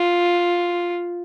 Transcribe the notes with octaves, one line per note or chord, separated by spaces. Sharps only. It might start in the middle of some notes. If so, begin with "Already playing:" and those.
Already playing: F4